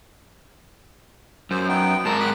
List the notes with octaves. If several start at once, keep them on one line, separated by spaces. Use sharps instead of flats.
F#2 C5
B3 D#4 G5
G#2 A#4 A5
B5 F#6